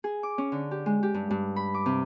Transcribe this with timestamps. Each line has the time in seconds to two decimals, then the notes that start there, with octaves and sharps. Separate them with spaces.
0.04 G#4
0.23 D6
0.38 C#4
0.52 D3
0.71 G4
0.86 G#3
1.03 G4
1.14 G2
1.30 G2
1.56 B5
1.74 D6
1.86 C3